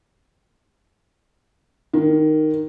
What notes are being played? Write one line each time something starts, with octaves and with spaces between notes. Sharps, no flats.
D#3